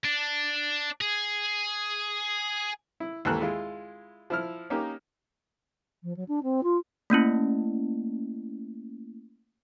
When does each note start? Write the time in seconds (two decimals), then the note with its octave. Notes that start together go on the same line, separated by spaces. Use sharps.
0.05 D4
1.01 G#4
3.00 E4
3.25 D#2 G#2 E3 A#3 A4 F#6
3.41 G#3 E4 F4
4.30 F3 E4 F6
4.70 A#3 C#4 D#4 G4
6.03 F3
6.16 F#3
6.28 D4
6.43 C4
6.63 F4
7.10 A3 A#3 C#4 E4